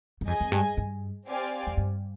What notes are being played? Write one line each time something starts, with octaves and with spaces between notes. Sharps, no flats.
G2
F2 G#4 D#5 G#5
F2
G2
G2
C4 G4 D5 F5 G#5
F2
G2